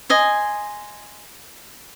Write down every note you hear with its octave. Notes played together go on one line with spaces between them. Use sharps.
D#5 G#5 C6